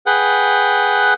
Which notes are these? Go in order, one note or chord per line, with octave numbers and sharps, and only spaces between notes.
G#4 B4 F#5 G5